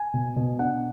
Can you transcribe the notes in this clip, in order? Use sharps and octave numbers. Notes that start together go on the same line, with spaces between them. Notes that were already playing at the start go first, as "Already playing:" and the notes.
Already playing: G#5
B2
B2
D4 F#5